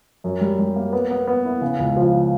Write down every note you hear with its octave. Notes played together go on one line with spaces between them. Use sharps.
F#2
G3
G3
A#3
B3
B3
B3
E4
C#3
C#2
F3